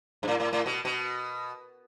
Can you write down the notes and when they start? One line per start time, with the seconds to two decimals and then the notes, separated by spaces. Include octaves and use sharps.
0.23 G2
0.28 A2
0.40 A2
0.53 A2
0.66 B2
0.85 B2